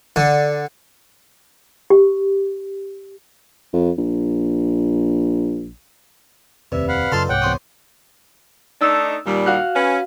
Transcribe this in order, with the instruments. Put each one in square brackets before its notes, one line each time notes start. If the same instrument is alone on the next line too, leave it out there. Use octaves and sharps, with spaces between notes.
[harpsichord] D3
[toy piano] G4
[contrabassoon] F2
A#1
[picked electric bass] F1 D#2 [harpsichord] C3 [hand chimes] B4 D5 [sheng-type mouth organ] E5
[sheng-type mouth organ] F5 F#5 B5
[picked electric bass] F#2 C#3 [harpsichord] D#4 F4 A4 [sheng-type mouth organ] A5 C6 F6
[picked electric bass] C2 G#2 [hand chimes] C#5 D6 [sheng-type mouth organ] F#5 G5
[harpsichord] E2 C5 D#6 [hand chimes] C#6
[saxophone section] A3 D4 D#4 [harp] E6
[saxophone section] D#2 A#2 G3
[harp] F#4 F5 F#5
[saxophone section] C#4 B4